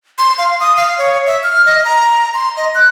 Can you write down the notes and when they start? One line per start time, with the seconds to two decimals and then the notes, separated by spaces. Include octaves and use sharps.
0.18 C6
0.38 F5
0.60 D#6
0.76 F5
0.98 C#5
1.26 E5
1.43 F6
1.66 D#5
1.85 A#5
2.34 C6
2.57 D#5
2.75 F#6